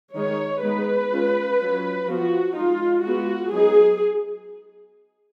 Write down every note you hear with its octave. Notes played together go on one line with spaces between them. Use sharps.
D#3 G#3 D#4 C#5
G#3 B3 D#4 B4
G#3 C#4 F4
F#3 C#4 F4
F3 B3 F4 F#4
G#3 D#4 F4
G#3 B3 F4 F#4
F#3 B3 D#4 G#4